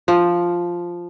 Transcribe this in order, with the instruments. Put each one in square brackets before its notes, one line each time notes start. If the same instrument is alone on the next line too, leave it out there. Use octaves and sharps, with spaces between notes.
[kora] F3